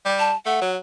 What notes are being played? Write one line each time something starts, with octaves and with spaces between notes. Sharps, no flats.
G3
A5
A3 F#5
F#3